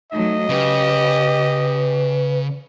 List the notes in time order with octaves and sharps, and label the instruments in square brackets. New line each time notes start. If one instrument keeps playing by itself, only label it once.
[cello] F#3 A3 [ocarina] D#4 [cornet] D#5
[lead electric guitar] C#3 [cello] G4 [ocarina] B4